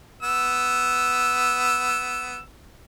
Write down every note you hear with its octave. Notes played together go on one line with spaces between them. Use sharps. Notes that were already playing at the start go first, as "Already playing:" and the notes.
B3 E6